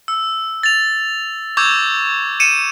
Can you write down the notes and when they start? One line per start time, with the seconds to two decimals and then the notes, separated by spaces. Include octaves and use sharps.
0.08 E6
0.63 A6 F7
1.57 C#6 D6 E6 G6 G#6
2.40 C#7 D#7 E7